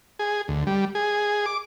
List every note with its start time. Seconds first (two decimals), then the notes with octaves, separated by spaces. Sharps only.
0.19 G#4
0.48 D2
0.67 G3
0.95 G#4
1.46 D6